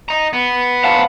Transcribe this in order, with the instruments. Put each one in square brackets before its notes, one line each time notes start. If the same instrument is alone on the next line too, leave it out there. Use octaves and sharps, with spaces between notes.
[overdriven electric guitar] D#5 A#5
B3
[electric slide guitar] F5 F#5 A5